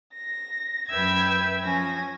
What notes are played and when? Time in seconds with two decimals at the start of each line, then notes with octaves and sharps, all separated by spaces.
0.13 A#6
0.88 F#2 B4 E5 G5 E6 G#6
1.60 F3 C#4 G#5 A#6